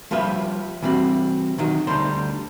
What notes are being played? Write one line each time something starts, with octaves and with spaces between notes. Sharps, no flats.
F3 G3 F4 G4 B4 E5
E3 G3 C4 F#4
D#3 F#3 D#4
D2 G3 D#4 C5 C6